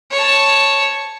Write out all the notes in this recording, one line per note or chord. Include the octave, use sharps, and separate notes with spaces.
C#5 A5